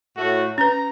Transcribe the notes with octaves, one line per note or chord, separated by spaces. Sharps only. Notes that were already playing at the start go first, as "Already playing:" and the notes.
A2 A3 F#4
C#4 B4 A#5